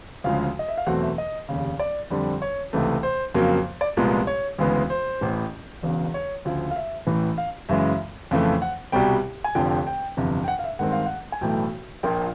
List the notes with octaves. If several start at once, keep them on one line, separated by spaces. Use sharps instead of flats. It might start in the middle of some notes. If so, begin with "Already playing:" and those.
D2 C#3 F3 G#3 F5
D#5
E5
F5
E2 B2 F#3 A3 C4 F#5
E5
D#5
F1 D#2 C#3
D5
F2 D3 G3 C4
C#5
C#2 C3 E3 A3
C5
F2 C#3 F#3 A#3
D5
C2 A#2 F3 G#3 B3
C#5
D2 C#3 E3 G#3 B3
C5
A1 A2 E3
E1 E2 C#3
C#5
D2 C#3 F3
F5
E5
A1 A2 E3
F5
F#2 C#3 E3 G#3 E5
F2 C#3 E3 A3
F#5
C2 B2 G3 G5
G#5
F1 F2 D3 F3 G5
G5
G5
G1 F2 C3 E3
G5
F#5
F5
E5
G2 D#3 G#3 C4 F#5
F5
F#5
G#5
B1 A2 E3 A3 G5
A#1 A#2 F3 A#3 G5